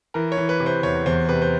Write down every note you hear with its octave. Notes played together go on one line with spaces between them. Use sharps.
E3 A#4
C#5
E3
B4
C3
C5
E2 C#5
E2 C5
C3 B4
C5